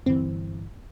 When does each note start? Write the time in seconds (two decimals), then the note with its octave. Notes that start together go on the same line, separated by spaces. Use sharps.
0.06 G1 E3 C4